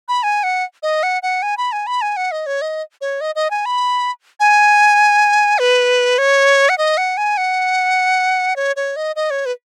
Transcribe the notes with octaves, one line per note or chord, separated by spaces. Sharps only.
B5
G#5
F#5
D#5
F#5
F#5
G#5
B5
G#5
B5
G#5
F#5
D#5
C#5
D#5
C#5
D#5
D#5
G#5
B5
G#5
B4
C#5
F#5
D#5
F#5
G#5
F#5
C#5
C#5
D#5
D#5
C#5
B4